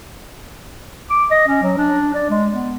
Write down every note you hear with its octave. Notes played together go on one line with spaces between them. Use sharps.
D6
D#5
C#4
F#3
D4
D5
G#3
B3